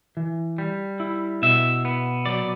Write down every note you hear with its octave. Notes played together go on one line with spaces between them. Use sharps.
E3
G3
E4
B2 E5
B3
F#3 D5